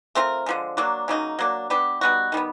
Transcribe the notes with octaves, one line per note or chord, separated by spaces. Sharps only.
A3 C4 F4 A#4
D3 F3 G#3
F#3 A#3 D4
C#3 F#3 A#3 D#4
F#3 A#3 D4
B3 D4 G4
G3 B3 D#4 F#4
D#3 G3 B3